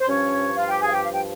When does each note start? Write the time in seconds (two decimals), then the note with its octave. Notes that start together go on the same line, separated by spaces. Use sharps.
0.01 C5
0.08 G2 F3 C#4 C#5
0.57 F4 F5
0.69 G4 G5
0.82 G#4 G#5
0.88 F5
0.93 G4 G5
1.06 F5
1.13 G5